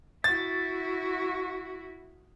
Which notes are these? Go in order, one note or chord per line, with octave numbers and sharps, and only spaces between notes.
E4 F#4 A6